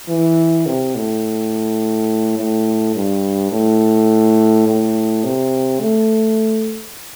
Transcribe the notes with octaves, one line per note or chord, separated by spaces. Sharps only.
E3
C3
A2
A2
G2
A2
A2
C3
A3